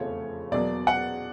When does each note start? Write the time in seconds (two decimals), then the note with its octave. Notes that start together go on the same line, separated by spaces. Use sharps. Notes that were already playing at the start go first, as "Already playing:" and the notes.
Already playing: F1 E2 C#3 F3 A3 C#5
0.51 E2 B2 F#3 A#3 D5
0.87 F#5